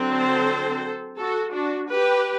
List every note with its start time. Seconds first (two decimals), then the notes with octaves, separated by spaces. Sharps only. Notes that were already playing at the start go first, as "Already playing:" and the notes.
Already playing: D3 F#3 C4
0.10 A4 C5
1.18 F#4 A4
1.53 D4 F#4
1.89 G4 B4